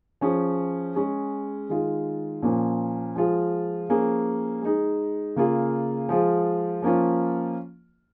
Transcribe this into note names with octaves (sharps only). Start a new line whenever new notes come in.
F3 C#4 G#4
G#3 C#4 G#4
D#3 G#3 F4 G#4
A#2 F3 A#3 C#4
F3 G#3 F4 G#4
F3 A#3 C#4 G#4
G#3 D#4 G#4
C#3 A#3 F4 G#4
F3 G#3 F4 G#4
F3 A#3 C#4 F4